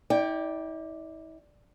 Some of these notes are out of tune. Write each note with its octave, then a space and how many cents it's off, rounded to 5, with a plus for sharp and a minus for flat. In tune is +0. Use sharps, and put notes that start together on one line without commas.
E4 -45 D5 +0 G5 +0